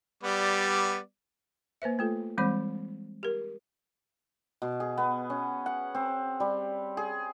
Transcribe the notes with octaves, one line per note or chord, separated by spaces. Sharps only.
G3 B3 D5
A#3 B4 C5 E5
A3 F4 A4
E3 G3 G#3 C4 C5 B5
G4 A#4
B2
G#4
B3
C#4
F#5
C4
G3
G#4